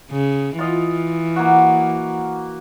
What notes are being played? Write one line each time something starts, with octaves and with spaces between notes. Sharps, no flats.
C#3
E3 F4 D#5
A#3 F#4